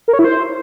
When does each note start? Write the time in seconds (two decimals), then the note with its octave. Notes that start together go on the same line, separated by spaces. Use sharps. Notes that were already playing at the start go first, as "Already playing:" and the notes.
0.08 A#4
0.13 C#5
0.19 E4
0.25 C5